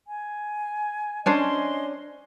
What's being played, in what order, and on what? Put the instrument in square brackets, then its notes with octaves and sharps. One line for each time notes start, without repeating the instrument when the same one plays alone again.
[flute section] G#5
[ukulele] C#4 D4 C5 [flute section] D#5 G#5 C6